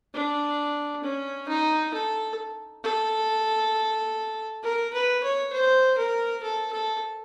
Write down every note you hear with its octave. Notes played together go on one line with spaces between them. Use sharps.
D4
C#4
D#4
A4
A4
A#4
B4
C#5
C5
A#4
A4
A4